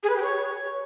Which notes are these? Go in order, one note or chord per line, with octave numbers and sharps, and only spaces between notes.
G#4
B4
G4
C#5